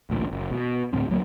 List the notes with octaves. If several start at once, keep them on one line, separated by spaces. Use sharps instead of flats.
A1 D2 A#2
F#1
B2
D2 A2 G#3 C4
D2 F#3 A#3